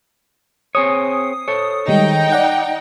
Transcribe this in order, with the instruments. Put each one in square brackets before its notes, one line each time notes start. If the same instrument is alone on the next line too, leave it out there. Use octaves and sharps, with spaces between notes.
[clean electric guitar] C4 G#4 C#5 [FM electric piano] D#6
[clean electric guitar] A4 C5 C#5
[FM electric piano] D#3 G3 G#3 [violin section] D#4 G5
[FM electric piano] D5 F#5